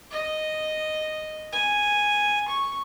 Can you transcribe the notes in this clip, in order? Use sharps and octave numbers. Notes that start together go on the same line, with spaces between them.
D#5
G#5
C#6